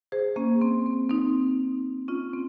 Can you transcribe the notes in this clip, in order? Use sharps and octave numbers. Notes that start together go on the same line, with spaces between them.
G#4 C5
A#3 C#4
C4
C4
C4 D#4
C#4 F4
C4